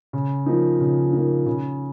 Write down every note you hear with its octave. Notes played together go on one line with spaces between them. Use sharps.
C#3
F3 A#3 D#4
C#3
F3 A#3 D#4
C#3